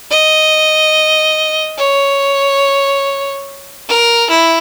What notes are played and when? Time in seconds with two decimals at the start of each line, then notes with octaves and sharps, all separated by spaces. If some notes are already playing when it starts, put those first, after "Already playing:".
0.11 D#5
1.79 C#5
3.88 A#4
4.30 E4